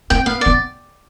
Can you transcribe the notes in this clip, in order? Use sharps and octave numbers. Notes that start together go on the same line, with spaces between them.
C4 G5
B3 F5
B3 D5